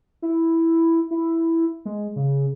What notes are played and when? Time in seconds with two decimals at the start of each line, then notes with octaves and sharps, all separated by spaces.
0.22 E4
1.11 E4
1.85 G#3
2.16 C#3